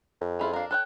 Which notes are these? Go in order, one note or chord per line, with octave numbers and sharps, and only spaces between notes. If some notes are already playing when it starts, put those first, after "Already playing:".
F2
C#4 E4 F4 G#4
D4 A#4 F5
A4 C#5 G5 F#6